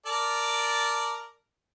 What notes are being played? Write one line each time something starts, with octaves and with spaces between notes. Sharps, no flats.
A#4 D5 A5